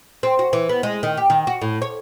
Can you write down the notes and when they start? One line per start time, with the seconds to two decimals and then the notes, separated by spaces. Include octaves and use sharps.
0.23 C4
0.39 F#4
0.53 E3
0.69 B3
0.83 G#3
1.03 D#3
1.17 G4
1.30 D#3
1.47 F#4
1.62 A2
1.82 C#5